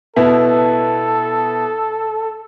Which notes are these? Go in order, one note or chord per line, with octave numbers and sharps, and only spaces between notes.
B2 B3 E4 A4